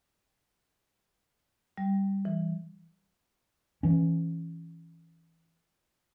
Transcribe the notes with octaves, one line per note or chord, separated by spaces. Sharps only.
G3
E3
E3 C#4